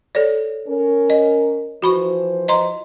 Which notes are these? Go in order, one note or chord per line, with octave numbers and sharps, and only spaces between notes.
A4 C#5 D5
C#4 A#4
D#5
E3 F3 F#4 C5 B5 C#6
D#5 A#5 C6